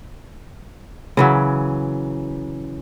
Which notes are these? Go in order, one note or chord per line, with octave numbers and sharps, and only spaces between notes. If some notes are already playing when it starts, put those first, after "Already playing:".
C#3 E3 F#3